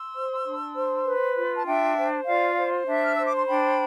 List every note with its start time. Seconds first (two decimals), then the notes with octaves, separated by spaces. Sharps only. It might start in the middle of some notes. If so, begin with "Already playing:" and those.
Already playing: C6 E6
0.14 C5
0.45 D4
0.75 C5
1.05 B4
1.36 F4
1.55 A5
1.66 D4 E5 G5
1.97 C5
2.26 F4 D5 F5
2.56 C5
2.86 D4 E5
3.05 F6
3.15 C5 E6
3.26 D6
3.37 C6
3.47 D4 G5 B5